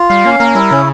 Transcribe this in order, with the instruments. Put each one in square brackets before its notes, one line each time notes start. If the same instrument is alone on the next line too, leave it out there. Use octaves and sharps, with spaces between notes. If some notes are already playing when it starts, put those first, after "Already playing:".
Already playing: [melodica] F4
[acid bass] G3 [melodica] F5
[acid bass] A#3 [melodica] C#4
[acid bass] A#3 [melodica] A#4
[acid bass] G3 [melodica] E4
[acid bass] C#3 [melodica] C#4